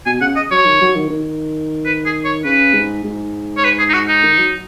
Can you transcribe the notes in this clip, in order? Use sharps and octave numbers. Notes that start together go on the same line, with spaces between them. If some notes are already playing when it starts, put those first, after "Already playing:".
B2 G#5
C#3 F#5
D#5
F#3 C#5
D#3
F#3
D#3
D#3
B4
G#4
C#5
C#3 B4
G#2
G#2
C#5
B4
G#4
D#4
F#4
D#4
D#3
F#3